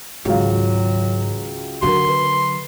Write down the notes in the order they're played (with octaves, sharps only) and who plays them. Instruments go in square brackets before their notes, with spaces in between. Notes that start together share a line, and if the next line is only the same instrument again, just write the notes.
[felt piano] C#2 F#4 F5 [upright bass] G#2 D#3 [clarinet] F#3
[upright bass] D3 F#3 [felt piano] F#4 A#4 [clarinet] C6
[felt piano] B4